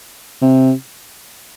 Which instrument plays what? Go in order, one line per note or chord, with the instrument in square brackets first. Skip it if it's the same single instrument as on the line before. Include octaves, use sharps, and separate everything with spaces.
[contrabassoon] C3